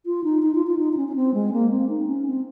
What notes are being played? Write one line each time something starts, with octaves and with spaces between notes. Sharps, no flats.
F4
D#4
D#4
F4
F4
D#4
D#4
C#4
C#4
C4
G#3
A#3
C4
D#4
C#4
C4